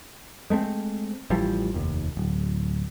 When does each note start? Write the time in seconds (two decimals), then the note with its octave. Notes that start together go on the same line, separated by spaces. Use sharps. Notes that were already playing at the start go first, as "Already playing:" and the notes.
0.50 G#3 A3 B3 C4
1.30 A1 E3 F3 G3
1.74 F1 D#2
2.17 D1